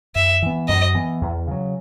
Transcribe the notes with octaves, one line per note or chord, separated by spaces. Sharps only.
F#2 E5
E3 B3
F#2 D#5
E3 B3
E2
C#3 F#3